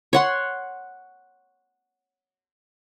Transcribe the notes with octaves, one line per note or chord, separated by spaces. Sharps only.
C#5 F#5 C6